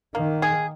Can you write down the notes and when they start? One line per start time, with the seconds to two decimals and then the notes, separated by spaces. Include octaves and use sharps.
0.15 D#3 A#3
0.42 G#4